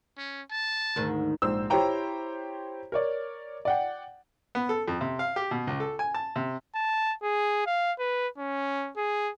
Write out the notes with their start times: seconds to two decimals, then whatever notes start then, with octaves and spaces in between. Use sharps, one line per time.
0.17 C#4
0.51 A5
0.96 D2 G#2 D#3
1.42 A#1 G#2 C5 E6
1.70 E4 G4 C5 C#5 G5 A#5
2.92 A#4 C#5 D5
3.65 D5 F#5 G5
4.55 B3
4.69 A4
4.88 F2
5.01 C3
5.19 F5
5.36 G4
5.51 B2
5.67 C#2
5.80 A4
5.99 G#5
6.14 A5
6.36 C3
6.75 A5
7.23 G#4
7.66 F5
7.99 B4
8.38 C#4
8.97 G#4